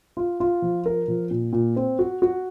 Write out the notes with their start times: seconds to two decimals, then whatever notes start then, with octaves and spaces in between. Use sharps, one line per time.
0.17 F4
0.40 F4
0.62 F3
0.86 A#4
1.08 F3
1.31 A#2
1.53 A#2
1.76 C4
1.99 F#4
2.22 F#4